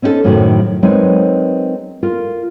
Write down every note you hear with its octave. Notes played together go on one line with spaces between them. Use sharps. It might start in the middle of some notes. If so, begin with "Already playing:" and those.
C4 C#4 D#4 E4 A4
F#2 A2 C3 D#3 F#3 F#4
F#3 G#3 C4 D#4 A#4 B4
F4 A#4